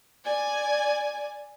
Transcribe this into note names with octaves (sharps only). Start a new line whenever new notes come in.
D5 G#5